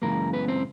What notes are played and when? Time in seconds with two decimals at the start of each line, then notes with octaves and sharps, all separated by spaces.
0.02 F#2 C#3 E3 G#3 A#3 A#4
0.33 B3 B4
0.48 C4 C5